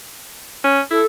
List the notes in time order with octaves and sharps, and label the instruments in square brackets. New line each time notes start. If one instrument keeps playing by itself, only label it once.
[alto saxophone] C#4
[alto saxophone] E4 [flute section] A4